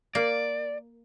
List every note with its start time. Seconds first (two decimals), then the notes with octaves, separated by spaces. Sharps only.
0.15 A#3 D5